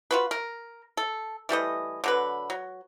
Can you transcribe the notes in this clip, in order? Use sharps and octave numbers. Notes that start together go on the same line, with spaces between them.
F4 F#4 B4
A#4
A4
E3 G3 A3 D#5
D3 F#3 B4
F#3